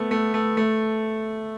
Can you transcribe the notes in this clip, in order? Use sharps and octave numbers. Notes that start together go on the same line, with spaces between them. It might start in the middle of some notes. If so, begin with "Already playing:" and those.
Already playing: A3 B3
A3
A3
A3